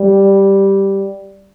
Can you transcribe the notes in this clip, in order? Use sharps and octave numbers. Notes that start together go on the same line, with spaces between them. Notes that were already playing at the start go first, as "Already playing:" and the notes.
Already playing: G3